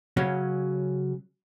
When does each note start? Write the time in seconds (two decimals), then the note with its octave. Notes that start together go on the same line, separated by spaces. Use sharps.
0.17 C#3 F#3 C#4